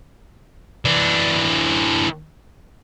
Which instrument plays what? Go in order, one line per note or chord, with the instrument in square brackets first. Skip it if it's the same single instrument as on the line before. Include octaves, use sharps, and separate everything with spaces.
[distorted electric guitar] E3 D4